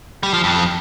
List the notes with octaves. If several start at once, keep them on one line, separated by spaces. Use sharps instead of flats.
G3
F3
F2